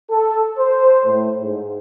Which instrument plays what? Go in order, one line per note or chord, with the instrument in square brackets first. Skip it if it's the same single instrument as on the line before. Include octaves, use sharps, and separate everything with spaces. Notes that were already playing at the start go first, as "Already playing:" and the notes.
[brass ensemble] A4
C5
A2
G#2